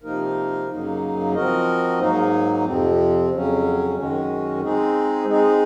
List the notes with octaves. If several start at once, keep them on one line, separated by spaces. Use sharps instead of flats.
C3 F3 A#3 D#4 A#4
F#2 C#3 F#3 A#3 D#4
F3 C4 F#4 A#4 D#5
G#2 F#3 A#3 D#4
F2 C3 F3 C4
F2 C#3 F#3 C#4
F#2 D#3 G#3 C#4 F#4
G#3 C4 D#4 G#4
G#3 C4 D#4 G#4